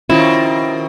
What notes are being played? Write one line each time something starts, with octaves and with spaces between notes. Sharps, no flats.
B2 D#3 C4 C#4 E4 F4